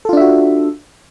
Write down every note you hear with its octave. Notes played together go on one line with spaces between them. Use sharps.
D4 F4 F#4 A4 E5